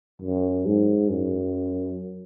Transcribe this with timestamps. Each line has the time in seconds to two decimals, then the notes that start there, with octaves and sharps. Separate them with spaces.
0.22 F#2
0.66 G#2
1.10 F#2